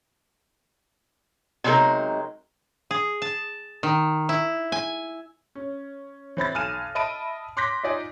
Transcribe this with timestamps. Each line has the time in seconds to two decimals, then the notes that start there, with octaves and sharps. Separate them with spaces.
1.64 C3 F#3 G#3 C4 D#4 A#4
2.91 G#4
3.22 A5
3.83 D#3
4.29 E4
4.72 G#5
5.55 C#4
6.37 E3 C4 B5 A6
6.54 B1 G#5 F6 D#7 E7
6.95 D#5 E5 A5 B5 D7 D#7
7.57 C6 D6 F#6 G6 A#6 B6
7.83 D#4 F4 D5 D#5 G#5